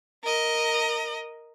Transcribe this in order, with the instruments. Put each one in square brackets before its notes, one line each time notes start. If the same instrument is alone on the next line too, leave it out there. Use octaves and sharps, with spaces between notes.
[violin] A#4 D#5